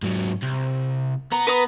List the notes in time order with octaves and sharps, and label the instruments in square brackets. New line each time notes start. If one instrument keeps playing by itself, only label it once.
[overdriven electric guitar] G#2 F#3
C2
[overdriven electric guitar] B3 [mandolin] A#5
[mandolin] B4 A#5 D#6